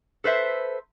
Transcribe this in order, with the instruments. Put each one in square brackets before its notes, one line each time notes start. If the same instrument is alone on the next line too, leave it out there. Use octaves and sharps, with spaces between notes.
[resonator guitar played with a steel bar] A4 B4 C5 E5